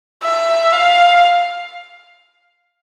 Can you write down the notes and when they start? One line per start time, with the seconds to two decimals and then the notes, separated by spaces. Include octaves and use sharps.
0.23 E5
0.72 F5